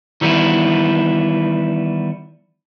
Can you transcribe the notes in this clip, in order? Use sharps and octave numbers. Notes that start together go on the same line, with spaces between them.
D#3 E3 G3 B3 E4